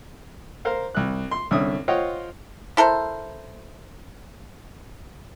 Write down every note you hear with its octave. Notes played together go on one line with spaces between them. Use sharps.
A#4 C5 F5
C2 F#6
C6
C2 D3 C#4 E5 D#6
F4 C5 C#5 D#5 F#5 G5
E4 A4 A#4 C5